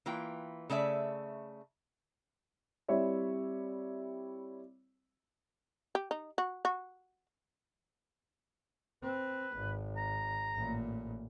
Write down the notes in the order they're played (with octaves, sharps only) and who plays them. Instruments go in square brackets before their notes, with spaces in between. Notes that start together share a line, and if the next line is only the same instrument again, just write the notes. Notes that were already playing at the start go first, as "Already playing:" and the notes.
[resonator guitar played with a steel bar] E3 A#3 F4 G5
C#3 A3 D5 E5
[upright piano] G3 C4 E4 C#5 D5 E5
[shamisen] G4
D#4
F#4
F#4
[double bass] C4 [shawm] B4
[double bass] G#1
[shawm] A#5
[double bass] A1 A#2